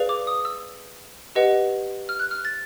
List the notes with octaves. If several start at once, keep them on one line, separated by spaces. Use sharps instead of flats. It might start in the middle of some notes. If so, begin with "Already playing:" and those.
Already playing: G#4 B4 D5 F5
D6
D#6
E6
G4 B4 D#5 F#5
F6
F#6
F6
A6